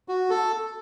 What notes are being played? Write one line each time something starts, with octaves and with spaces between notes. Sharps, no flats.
F#4
A4